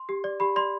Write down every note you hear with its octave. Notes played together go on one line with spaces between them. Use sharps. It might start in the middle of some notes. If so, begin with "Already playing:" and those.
Already playing: C6
G4
D5
G4 B5
D5 C6